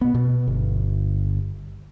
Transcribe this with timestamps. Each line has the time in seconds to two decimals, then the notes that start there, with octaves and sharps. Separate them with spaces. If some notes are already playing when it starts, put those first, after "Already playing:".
0.01 B2 B3
0.14 B2
0.47 G1